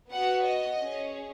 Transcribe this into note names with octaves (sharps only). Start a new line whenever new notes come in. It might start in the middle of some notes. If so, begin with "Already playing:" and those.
B3 F#4 F#5
D#5
C#4 G#4